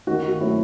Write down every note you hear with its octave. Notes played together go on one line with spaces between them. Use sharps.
D#3 F#4
F#4
F#3 A3 C4 E4